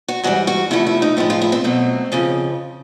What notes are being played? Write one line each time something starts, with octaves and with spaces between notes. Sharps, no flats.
F#4
G#2 E3 G3 F#4
F#4
E2 C3 F3 A3 E4
E4
D#4
A2 F3 G#3 E4
F4
E4
C4
B2 F#3 A3
F2 C#3 F3